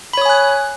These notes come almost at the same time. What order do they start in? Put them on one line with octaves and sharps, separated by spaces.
B5 C#5 D#6 G#5 F#6